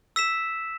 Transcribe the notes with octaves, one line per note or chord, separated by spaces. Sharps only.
E6 B6 E7